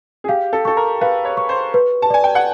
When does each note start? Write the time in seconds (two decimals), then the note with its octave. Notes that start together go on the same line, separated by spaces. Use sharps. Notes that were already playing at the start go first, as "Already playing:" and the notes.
0.24 G#4
0.28 G4 F5
0.53 A4
0.65 A4 C#6
0.77 A#4
1.01 B4 F5
1.25 C#5
1.37 C#6
1.49 C5
1.74 B4
2.02 A5
2.10 D5 G#5
2.24 G5
2.35 F#5